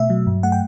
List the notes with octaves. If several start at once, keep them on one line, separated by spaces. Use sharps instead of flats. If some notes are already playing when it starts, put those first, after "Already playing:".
Already playing: B2 A3 E5
F#3
G2
A3 F#5
G5